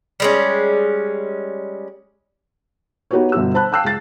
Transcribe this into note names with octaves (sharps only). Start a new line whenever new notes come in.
G3 G#3 C#4
B3 D#4 F#4 G4 B4 C#5
G1 B2 F#4 E6
C5 A5 B5 F#6
F5 G5 A5 E6 F#6 C7
C#2 A6